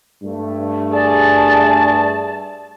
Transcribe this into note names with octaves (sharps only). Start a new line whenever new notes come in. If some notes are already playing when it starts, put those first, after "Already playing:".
G2 A3
G#4 D5 A5